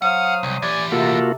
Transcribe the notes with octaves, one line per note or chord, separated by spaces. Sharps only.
F#3 C5 F5 F#5 D#6
C2
E3 G4 D5 G#5
C3 A#3 F4 F#4 A4